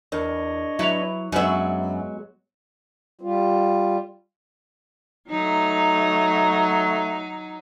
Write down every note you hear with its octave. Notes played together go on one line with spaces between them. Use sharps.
E2 D4 A#4 C#5 D#5
F#3 E4 B4 E5 F7
F#2 F#3 G#3 B3 D4 E5 F#7
G3 F4
F#3 A3 D#4